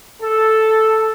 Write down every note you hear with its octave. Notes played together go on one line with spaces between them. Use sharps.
A4